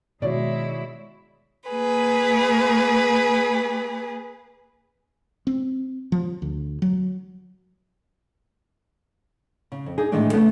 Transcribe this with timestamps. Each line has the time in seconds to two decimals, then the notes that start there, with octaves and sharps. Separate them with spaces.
0.22 B2 D#3 G#3 E4 F#4 C#5 D5
1.69 A#3 G#4 B4
5.47 C4
6.12 F3
6.42 D2
6.82 F#3
9.72 C#3
9.86 F2
9.98 D4 D#4 G#4
10.12 A2 D#3 E3 G#3 A3 D4
10.33 C#3 A3 B3 C#4